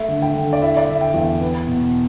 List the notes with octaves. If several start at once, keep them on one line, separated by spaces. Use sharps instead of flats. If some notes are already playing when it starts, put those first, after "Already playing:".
Already playing: A3 E5
D3
G5
D3
D5
E4 E5
D5
D3 E5
G5
E2
B3
B2